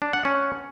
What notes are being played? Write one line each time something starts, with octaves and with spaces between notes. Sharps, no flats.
D4
F#5
C#4